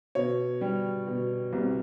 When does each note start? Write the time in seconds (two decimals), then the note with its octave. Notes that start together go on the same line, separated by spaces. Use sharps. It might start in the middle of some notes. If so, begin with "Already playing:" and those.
0.15 B2 C#5
0.61 G3
1.07 B2
1.53 C2